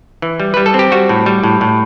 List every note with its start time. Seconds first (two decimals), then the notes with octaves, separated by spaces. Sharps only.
0.22 E3
0.40 G3
0.54 G3 B4
0.66 A4
0.74 C4
0.79 G4
0.92 G3 F#4
1.09 A2
1.26 G3
1.44 A2
1.61 A2